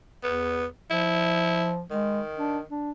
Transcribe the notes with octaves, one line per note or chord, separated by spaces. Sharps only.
E2 B3
F3 E4
D#3 G#3
D4
D4